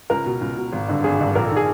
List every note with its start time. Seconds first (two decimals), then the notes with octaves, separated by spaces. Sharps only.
0.10 C#2 A#4
0.26 B2
0.41 C#2
0.57 B2
0.73 G#1
0.89 G2 D3
1.04 G#1 G#4
1.19 G2 D3
1.35 A#1 A#4
1.46 A4
1.52 D#3 G#4